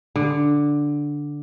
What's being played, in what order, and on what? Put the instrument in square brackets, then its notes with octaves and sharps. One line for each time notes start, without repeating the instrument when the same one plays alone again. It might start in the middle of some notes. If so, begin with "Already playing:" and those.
[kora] D3